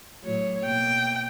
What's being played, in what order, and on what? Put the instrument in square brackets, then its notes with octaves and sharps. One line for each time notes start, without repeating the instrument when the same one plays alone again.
[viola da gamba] A2 F#3 C#5
[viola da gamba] B2 A#3 [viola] G5